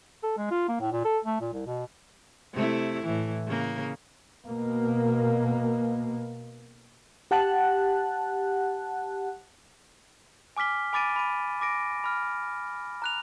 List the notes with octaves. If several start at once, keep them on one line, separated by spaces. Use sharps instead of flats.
A4
G#3
F4
A#3
A2
A#2
A4
A3
A#2
C2
B2
C3 A3 E4
A2 E3
C#3 A#3
B2 A#3
G4 F#5 A5 F#6
G#5 D6 F6 B6 G7
G#5 B5 D6 A6 D7 D#7
B5 D#7
D6 A#6 D7
B5 F6
A#5 F#6 F7